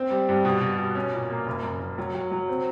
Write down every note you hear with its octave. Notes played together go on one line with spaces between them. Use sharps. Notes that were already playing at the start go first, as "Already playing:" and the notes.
Already playing: C4
G3
G2
B2
B2
B2
C#4
A#2
A#3
F#1
F#2
F#1
F#3
F#3
F#3
C4